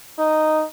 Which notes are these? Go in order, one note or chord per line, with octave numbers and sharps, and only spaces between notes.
D#4